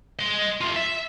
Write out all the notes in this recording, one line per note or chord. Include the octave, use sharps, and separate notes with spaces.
D#5 C6
A3 F4
E5